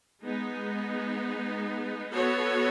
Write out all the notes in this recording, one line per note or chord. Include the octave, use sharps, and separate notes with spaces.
G#3 B3 D#4
B3 F#4 A4 C#5